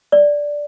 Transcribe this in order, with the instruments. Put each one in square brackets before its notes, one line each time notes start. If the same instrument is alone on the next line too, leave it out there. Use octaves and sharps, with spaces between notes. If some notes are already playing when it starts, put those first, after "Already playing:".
[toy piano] D5